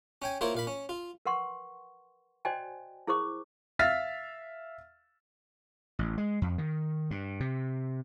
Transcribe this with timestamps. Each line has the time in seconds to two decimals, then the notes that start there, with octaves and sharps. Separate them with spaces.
0.22 C#4 G5 G#5
0.41 A#3 E4 F4 C5 C#5
0.55 A#2 F5 B5
0.67 C#4
0.89 F4
1.26 A#4 B4 F#5 C6 C#6
2.45 F#4 C5 D5 D#5 G5 G#5
3.07 E4 G#4 A#4 C5 C#6 D6
3.79 E5 F5 F6 A6 B6
5.99 A1
6.18 G#3
6.42 F2
6.58 D#3
7.11 G2
7.40 C3